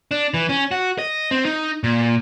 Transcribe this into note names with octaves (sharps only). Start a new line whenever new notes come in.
D4
E3
C#4
F#4
D#5
C4
D#4
A#2